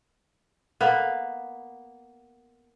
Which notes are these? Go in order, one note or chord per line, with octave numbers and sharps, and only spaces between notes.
A#3 B3